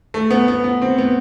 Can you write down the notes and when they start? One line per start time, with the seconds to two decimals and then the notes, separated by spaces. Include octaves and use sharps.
0.14 A3
0.30 B3
0.48 B3
0.64 B3
0.82 C4
0.98 B3